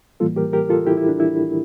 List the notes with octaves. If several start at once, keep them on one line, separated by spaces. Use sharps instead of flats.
A2 E3 G3 A#3 F4 A4
G4 A#4
G4 A#4
F4 A4
E4 G4
E4
D4
E4